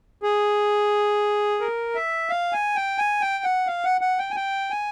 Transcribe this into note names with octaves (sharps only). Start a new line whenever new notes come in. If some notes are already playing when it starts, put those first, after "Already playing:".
G#4
A#4
E5
F5
G#5
G5
G#5
G5
F#5
F5
F#5
F#5
G5
G#5
G5
G#5